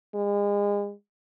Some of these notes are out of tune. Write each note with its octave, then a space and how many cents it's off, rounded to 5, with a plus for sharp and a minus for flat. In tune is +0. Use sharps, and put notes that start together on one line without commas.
G#3 -35